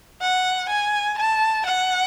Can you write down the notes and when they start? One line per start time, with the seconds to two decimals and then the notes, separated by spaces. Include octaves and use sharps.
0.22 F#5
0.69 G#5
1.18 A5
1.66 F#5